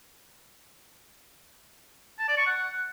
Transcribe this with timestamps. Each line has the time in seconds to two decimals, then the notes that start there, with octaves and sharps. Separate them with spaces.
2.19 A5
2.28 D5
2.37 C#6
2.46 F#5